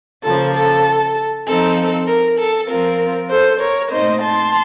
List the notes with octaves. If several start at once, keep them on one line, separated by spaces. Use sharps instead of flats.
C#3 F3 A#3 A4
A4
F3 C4 D#4 A4
A#4
A4
F3 C4 F4 A#4
A4 C5
A#4 C#5
A#2 A3 C4 D#4 C5 D#5
A5 C6